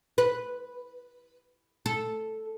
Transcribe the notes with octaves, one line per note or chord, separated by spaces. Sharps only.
B4
A4